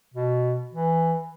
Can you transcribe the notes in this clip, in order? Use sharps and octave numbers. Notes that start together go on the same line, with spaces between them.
B2
E3